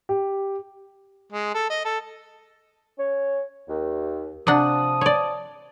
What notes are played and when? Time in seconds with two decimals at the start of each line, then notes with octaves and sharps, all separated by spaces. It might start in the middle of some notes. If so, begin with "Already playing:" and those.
0.09 G4
1.32 G#3
1.54 A4
1.70 D#5
1.85 A4
2.98 C#4 C#5
3.68 D#2
4.47 C3 F3 D4 F#5 A5 D#6
5.01 C#5 D5